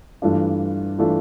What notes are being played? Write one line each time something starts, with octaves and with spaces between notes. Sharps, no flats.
G2 E3 A3 D4 F4
E3 A3 D4 F4